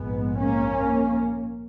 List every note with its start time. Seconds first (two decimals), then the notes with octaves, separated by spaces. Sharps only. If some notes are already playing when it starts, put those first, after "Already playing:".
Already playing: A#1 G#2 G#3 B3
0.39 A#3 C#4